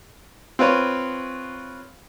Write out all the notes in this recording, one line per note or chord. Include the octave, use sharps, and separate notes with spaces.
C4 F4 B4 C#5